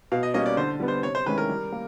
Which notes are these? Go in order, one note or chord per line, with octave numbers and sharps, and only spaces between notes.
B2 F5
D#5
G3 A#3 C#4 D#5
D5
D3 C5
G3 B3
C5
C3 C#5
C5
D#3 G#3 C#4 E4 B4
A#4
G3
A#3